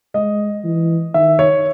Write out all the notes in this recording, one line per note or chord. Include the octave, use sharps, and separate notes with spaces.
G#3 D#5
E3
D#3 E5
C#5